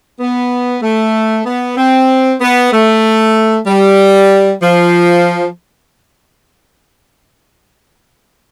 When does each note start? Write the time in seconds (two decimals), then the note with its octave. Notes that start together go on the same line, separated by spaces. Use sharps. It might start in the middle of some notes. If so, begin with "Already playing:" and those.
0.19 B3
0.82 A3
1.46 B3
1.77 C4
2.40 B3
2.73 A3
3.67 G3
4.61 F3